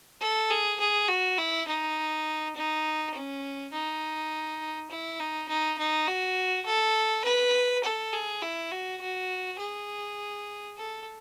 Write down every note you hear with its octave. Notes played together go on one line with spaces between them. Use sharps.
A4
G#4
G#4
F#4
E4
D#4
D#4
C#4
D#4
E4
D#4
D#4
D#4
F#4
A4
B4
A4
G#4
E4
F#4
F#4
G#4
A4